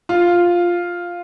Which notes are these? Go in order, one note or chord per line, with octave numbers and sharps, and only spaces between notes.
F4